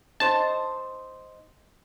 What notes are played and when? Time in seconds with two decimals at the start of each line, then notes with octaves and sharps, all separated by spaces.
0.20 D#4 C5 A5